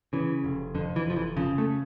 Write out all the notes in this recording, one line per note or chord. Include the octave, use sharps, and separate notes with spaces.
C#3 E3
F1
F2 D3
E3
F1 F3
E3
C#3 F3
A3